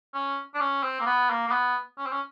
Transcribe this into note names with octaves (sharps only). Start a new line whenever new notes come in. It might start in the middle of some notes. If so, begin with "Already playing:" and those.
C#4
D4
C#4
C4
A#3
B3
A#3
A#3
B3
C#4
C4
C#4